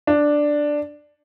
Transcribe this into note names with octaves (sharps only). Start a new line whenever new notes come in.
D4